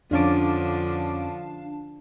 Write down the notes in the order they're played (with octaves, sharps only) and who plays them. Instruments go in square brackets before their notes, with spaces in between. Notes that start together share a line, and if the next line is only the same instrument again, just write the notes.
[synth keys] F2 C#4 D6 [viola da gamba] D3 F3 [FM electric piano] D4 F5 A5